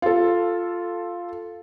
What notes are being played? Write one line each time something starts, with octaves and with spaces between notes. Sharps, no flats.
F4 A4